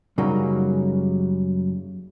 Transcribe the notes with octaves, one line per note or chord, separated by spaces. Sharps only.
F#2 C#3 F#3 G3 A#3 D#4